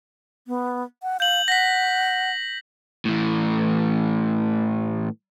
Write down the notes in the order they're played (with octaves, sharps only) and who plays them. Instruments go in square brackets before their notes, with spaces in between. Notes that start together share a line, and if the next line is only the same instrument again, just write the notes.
[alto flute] B3
F#5
[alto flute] F5 [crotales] G6 F#7
[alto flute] F#5 [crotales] A#6 B6
[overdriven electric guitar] A2 E3